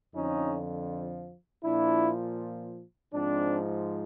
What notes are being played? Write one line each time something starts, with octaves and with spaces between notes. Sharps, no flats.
F2 D3 F3 C#4 D#4
A#2 F3 D4 E4
G#2 F3 C4 D4